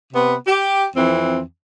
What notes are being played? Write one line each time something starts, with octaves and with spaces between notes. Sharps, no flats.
C3 B3
G4
F2 E3 C4